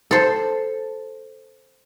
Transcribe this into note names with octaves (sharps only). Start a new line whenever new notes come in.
A4 C5